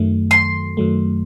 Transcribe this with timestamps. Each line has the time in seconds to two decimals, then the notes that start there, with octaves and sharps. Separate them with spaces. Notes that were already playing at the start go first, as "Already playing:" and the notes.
Already playing: F#2 D#3 F#3 A3
0.31 C6
0.77 F#2 D#3 F#3 A3